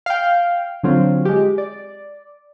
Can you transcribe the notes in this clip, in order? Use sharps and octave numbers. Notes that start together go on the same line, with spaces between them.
F5 G5
D3 F#3 C4 F4
G#3 G4
D5